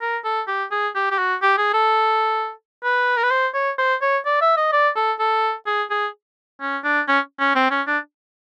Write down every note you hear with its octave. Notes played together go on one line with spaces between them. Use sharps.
A#4
A4
G4
G#4
G4
G4
F#4
G4
G#4
A4
B4
A#4
B4
C5
C#5
C5
C#5
D5
E5
D#5
D5
A4
A4
G#4
G#4
C#4
D4
C#4
C#4
C4
C#4
D4